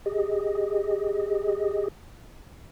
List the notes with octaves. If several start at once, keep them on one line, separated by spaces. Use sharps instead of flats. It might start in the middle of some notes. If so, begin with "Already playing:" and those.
G4 G#4 D#5